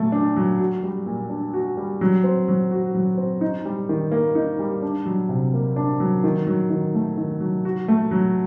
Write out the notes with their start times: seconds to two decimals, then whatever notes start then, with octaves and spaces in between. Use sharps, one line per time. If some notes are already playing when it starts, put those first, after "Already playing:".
Already playing: A#2 F#3 A3
0.12 D4
0.36 F#3
0.60 F#4
0.83 G3
1.06 A#2
1.30 D4
1.54 F#4
1.77 G3
2.01 F#3
2.24 C4
2.48 F#3
2.71 F#4
2.95 F#3
3.18 C4
3.41 D#4
3.65 G3
3.89 D#3
4.11 A#3
4.35 D#4
4.59 G3
4.82 D4
5.06 F#3
5.29 C3
5.54 A#3
5.76 D4
6.00 F#3
6.24 D#3
6.47 F#3
6.70 D#3
6.94 A3
7.18 D#3
7.40 F#3
7.65 F#4
7.88 A3
8.11 F#3